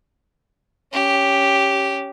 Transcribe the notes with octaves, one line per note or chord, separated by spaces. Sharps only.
C#4 G4